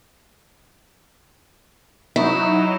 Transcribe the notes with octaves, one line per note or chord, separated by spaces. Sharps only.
F#3 D#4 E4